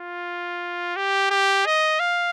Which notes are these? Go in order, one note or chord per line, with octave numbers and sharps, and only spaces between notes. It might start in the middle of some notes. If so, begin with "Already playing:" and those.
Already playing: F4
G4
G4
D#5
F5